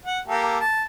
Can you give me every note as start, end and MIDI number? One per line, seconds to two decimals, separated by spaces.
0.06 0.20 78
0.28 0.59 58
0.28 0.59 67
0.28 0.59 69
0.60 0.84 81